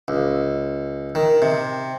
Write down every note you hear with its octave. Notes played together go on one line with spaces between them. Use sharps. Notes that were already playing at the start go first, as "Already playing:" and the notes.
C#2
D#3
C3